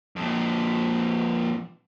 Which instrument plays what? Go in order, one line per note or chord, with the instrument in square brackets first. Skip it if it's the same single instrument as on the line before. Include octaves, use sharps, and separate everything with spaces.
[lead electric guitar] F2 A#2